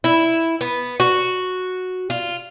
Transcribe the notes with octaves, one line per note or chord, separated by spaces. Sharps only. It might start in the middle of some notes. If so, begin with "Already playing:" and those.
E4
B3
F#4
F4